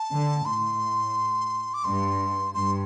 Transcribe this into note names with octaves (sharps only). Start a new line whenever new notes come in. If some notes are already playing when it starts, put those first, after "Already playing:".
Already playing: A5
D3
A2 C6
D6
G2 C6
G2 C6